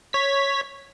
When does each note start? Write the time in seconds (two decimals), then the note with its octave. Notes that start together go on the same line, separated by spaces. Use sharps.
0.13 C#5 B6